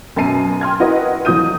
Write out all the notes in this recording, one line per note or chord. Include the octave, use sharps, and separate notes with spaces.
F#2 B2 A5 A#5 C7 D#7
G5 C6 F6 G#6
E4 F#4 A#4 B4 D#5
F2 E3 F#3 D#6 G6 D#7